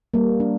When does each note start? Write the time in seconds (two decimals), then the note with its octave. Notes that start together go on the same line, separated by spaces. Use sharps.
0.14 G3 A#3
0.40 D4